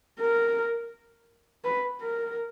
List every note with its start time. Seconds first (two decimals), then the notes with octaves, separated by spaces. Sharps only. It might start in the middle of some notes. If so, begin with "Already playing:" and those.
0.19 A#4
1.64 B4
2.02 A#4